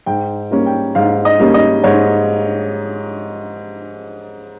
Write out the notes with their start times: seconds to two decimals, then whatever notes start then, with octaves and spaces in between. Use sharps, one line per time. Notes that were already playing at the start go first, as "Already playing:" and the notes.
0.06 G#2 G5
0.51 G3 A#3 C#4
0.66 G5
0.95 G#2 F5
1.25 D#5
1.39 G3 A#3 C#4
1.54 D#5
1.84 G#2 C#5